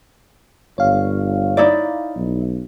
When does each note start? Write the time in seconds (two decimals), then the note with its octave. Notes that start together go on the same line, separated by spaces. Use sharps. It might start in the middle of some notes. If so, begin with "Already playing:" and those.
0.78 G1 C#5 F5
1.57 D#4 E4 D5
2.16 B1